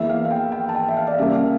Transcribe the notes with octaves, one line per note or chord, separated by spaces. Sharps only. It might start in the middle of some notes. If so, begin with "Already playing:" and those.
Already playing: E2 E3 A#3 E5
F5
F5
G5
G5
A5
G5
E5
F5
D5
C#3 G3 A#3 E5
F5